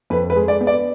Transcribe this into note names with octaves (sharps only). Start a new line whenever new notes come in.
F2 B4
B4
G#3
D5
B3
D5